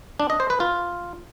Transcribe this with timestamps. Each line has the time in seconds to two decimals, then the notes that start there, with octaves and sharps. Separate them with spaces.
0.20 D4
0.30 D#5
0.40 C5
0.50 B4
0.60 F4